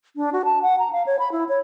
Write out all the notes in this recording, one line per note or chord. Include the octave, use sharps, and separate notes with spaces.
D4
F#4
A5
F#5
A#5
F5
C#5
B5
E4
C#5